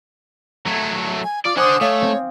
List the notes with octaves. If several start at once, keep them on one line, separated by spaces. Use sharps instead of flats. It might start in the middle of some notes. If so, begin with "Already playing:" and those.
F#3 A3 G#6 B6
G#5
F4 D5 D6 F6
D4 C5 F#5 G#5 D6 D#6
A3 C#5 F5
C4